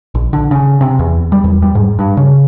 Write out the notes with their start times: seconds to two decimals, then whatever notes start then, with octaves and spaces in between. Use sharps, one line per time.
0.15 A#1
0.33 D3
0.51 C#3
0.81 C3
0.99 E2
1.32 G3
1.44 E2
1.62 G3
1.75 G#2
1.99 G2
2.17 C#3